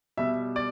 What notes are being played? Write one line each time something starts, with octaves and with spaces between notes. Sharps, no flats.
B2 G3 E5
D5